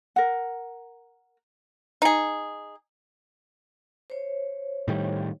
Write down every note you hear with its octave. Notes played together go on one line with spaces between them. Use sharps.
A#4 F#5
D#4 G#4
C5 C#5
A2 D#3 G3